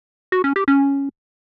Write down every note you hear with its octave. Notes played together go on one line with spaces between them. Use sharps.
F#4
C#4
G4
C#4